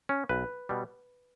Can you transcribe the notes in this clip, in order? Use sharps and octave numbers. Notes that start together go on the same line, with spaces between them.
C#4
B1 B4
B2 G3